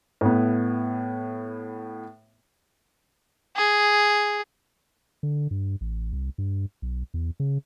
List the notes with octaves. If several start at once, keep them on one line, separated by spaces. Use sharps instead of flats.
A2 B3
G#4
D3
G2
A1
C2
G2
B1
E2
C#3